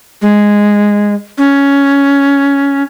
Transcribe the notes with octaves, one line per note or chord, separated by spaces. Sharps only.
G#3
C#4